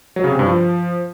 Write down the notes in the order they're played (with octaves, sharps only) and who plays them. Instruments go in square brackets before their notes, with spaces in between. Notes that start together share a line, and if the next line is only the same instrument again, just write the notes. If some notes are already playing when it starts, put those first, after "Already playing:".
[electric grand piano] F#3
C#3
C3
G2
F3